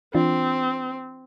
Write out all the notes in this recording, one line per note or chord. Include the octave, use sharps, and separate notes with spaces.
E3 C4 D4 F4